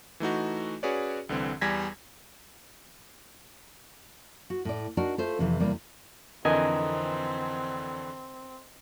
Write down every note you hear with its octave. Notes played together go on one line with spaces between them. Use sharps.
E3 A3 D#4 F#4
C#4 F#4 G#4 B4 C#5 D5
C2 D3 E3 C4
E2 G3 G#5 G#6 A#6 B6
F#4
A2 D5
D4 D#4 F#4 A#4
A3 F4 C5
F2 C3 E3
E2 C3 G3 A#3 D5
F2 D3 E3 C4 A#4 D#5 G#5